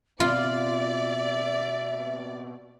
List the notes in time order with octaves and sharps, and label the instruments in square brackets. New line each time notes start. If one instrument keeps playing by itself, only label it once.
[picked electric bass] B2 B3 C4 [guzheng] F4 [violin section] D5 [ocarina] E5